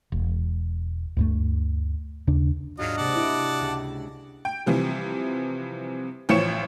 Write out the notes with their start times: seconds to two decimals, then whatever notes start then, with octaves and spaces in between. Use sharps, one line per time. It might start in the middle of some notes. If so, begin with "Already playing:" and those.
0.12 E1
1.17 D2 G2 A3
2.27 D#2 C#3 D4
2.79 G#2 F#3 D4 F4 F#4 D#5
2.97 C3 A#3 D5 F#5 A5
3.16 E4 D7
3.61 C#2
4.45 G5
4.66 C3 E3 F3 G3
6.29 A1 E3 F3 C#5 C#7 E7